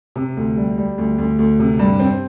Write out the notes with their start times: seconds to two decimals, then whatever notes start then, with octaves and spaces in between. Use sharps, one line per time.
0.16 C3
0.37 D2
0.57 G3
0.78 G3
0.98 D2
1.18 D2
1.39 D2
1.59 C3
1.79 G2
2.00 C4